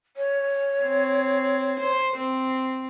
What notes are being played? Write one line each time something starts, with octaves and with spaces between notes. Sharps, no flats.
C#5
C4
C5
C4